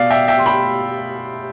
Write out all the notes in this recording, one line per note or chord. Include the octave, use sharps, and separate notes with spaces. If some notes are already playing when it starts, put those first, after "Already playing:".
Already playing: B2 D5 F5
E5 G5
E5 G5
C6
G5 B5